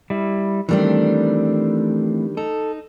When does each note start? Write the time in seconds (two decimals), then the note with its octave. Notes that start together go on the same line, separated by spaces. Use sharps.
0.10 G3 E4
0.69 D#3 E3 G3 A3 C4 D4
2.37 D#4 A4